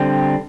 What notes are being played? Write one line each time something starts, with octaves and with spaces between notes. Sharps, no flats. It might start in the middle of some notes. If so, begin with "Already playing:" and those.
Already playing: D3 G3 C4